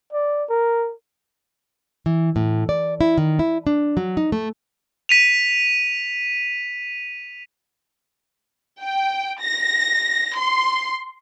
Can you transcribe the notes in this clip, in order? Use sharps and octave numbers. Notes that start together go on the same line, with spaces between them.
D5
A#4
E3
A2
D5
E4
D#3
E4
D4
F#3
D#4
A3
B6 D#7 F7
G5
A#6
C6